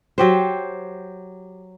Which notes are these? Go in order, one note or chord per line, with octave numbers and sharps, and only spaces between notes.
F#3 G4 C5